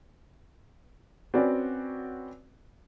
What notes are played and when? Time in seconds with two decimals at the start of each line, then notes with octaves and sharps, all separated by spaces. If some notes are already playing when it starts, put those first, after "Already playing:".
1.34 C4 C#4 F#4 B4 D5